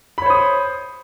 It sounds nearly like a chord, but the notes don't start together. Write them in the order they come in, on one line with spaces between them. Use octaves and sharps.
B5 C#5 C5 D#6